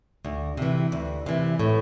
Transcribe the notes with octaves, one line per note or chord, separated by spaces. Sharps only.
D2
C3 E3
D2
C3 E3
A2